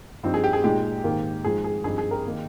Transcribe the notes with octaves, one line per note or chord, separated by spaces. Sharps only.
G2 F3 C4 D#4
G#4
G4
G#4
A#2 G#3 D#4 G4
G#2 D#3 A#3
G#2 F3 G#3 G#4
G#4
G2 F3 C4 D#4 G#4
G#4
G4 A#4
D#3 A#3 D#4